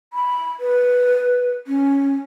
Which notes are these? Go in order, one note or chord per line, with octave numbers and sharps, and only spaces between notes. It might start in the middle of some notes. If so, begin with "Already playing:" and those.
B5
B4
C#4